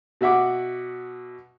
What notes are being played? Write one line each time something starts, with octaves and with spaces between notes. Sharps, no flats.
B2 F#4 E5 F#5 D6